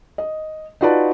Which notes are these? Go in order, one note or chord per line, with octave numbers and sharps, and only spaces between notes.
D#5
D#4 F4 F#4 B4 D5 A5